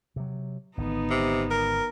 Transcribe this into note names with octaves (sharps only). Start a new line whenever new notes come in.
C3 F#3
G#1 D3 B3 D#4
C3
A#4